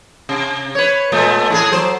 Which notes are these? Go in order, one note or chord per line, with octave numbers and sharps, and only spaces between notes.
C3
B4 C#5
A#2 G#3 A3
A2 E4 G#4
F#3 C5